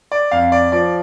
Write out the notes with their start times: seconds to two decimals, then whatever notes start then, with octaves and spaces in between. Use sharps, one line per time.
0.12 D5
0.31 F2 F5
0.52 D5
0.72 F3 D5